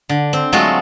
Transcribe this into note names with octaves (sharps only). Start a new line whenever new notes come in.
D3
C4
F#3 G#3 A3 F4 F#4